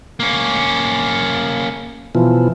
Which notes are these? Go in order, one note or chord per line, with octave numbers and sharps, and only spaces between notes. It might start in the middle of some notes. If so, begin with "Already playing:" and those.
A#3 C#4
B2 E3 F3